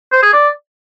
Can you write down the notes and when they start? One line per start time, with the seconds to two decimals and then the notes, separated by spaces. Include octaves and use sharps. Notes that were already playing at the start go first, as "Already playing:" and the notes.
0.12 C5
0.23 G#4
0.33 D5